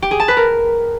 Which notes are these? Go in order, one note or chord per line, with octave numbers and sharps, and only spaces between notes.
G4
G#4
A5
B4
A#4